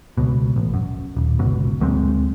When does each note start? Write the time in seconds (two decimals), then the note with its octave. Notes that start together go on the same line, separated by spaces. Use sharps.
0.18 C#2 B2
0.56 A1
0.74 F#2
1.17 D#1
1.39 G1 C#2 F#2 B2
1.80 D2 F#3 G#3 C4